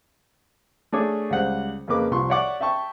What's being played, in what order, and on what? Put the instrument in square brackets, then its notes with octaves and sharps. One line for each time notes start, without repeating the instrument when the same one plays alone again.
[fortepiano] A3 D4 G#4 C#5 D6
C#2 G3 C5 F#5 F#6
F2 C#3 A#3 B4 D6
C2 F3 C6 C#6
C#5 D5 E5 F#5 C#6 D6
E5 G5 A5 C#6